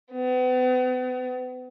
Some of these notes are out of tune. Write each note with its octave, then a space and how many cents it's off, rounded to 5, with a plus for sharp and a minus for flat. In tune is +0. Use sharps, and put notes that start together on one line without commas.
B3 +40